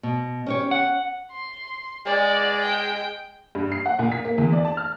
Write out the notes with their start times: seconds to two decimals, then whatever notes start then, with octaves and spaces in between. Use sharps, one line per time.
0.03 B2
0.46 C#4 G4 C#5
0.71 F#5
1.31 C6
2.06 G#3 D5
2.62 G5
3.55 G2
3.72 C7
3.86 F#5
3.99 A#2
4.12 B6
4.25 A#3
4.38 E2
4.53 D5
4.65 A5
4.77 F6